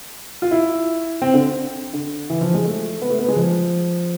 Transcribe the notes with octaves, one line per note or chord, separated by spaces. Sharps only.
F4
E4
C4
D3
D3
E3
F3
G#3
A3
B3
A3
B3
G#3
F3